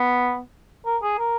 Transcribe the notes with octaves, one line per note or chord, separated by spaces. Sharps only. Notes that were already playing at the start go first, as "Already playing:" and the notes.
Already playing: B3
A#4
G#4
A#4